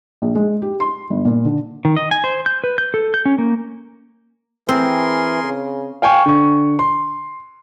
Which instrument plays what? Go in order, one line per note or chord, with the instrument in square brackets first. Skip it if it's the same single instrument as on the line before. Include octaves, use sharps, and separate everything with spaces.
[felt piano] A#1
G#3
G4
C6
G1
A#2
D3
[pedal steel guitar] D#3
D#5
G#5
C5
G6
B4
G6
A4
G6
C#4
A#3
[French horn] E3 [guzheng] C4 [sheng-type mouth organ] G#4 A#4 C6
[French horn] C#3
[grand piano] F5 G5 G#5 C#6
D3 C#6
C6